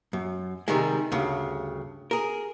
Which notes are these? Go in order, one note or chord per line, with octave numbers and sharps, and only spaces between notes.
F#2
C3 D#3 G3 G#3
D2 G2 C#3
G#4 A#4